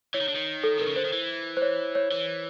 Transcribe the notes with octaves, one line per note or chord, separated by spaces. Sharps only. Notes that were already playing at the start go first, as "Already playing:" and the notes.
E3 C#5
D#3
D3
D#3
A4
C3 A#4
C#3
D3 C5
D#3
E3
C5
C#5
C#5
E3